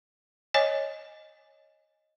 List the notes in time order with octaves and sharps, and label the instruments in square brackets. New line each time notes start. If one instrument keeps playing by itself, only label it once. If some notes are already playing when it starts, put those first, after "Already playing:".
[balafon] C#5 D#5 G#5